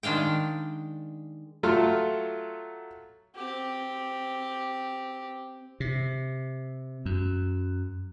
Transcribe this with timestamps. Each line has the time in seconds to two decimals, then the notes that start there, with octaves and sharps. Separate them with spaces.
0.03 D#3 G#3 D4 F5 G5
1.63 F#3 A3 F4 A4 C6 F6
3.36 C4 G4
5.80 C3
7.06 F#2